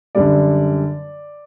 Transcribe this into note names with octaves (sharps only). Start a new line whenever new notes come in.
F#2 D3 G3 D5